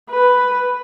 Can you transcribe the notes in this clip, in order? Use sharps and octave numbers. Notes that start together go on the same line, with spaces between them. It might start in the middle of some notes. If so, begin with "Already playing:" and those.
B4